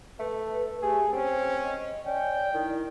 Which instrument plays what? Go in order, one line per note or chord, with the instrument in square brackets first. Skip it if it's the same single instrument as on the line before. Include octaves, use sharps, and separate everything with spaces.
[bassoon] A3 [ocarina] B4
[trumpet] A3 [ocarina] G4 [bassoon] G#4
[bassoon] C4 [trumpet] C#4 [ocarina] C5
[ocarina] D#5
[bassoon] C#4 [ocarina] D5 [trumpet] G5
[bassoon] D#3 [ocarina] E4